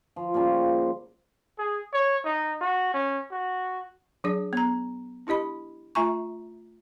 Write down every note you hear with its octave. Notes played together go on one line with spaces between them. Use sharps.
F3
C#3 F3 G3 A#3
G#4
C#5
D#4
F#4
C#4
F#4
F#3 D4 G#4 D5
B3 A#5
D4 E4 G4 D#5 B5
A3 F4 E5 G#5 A#5 C#6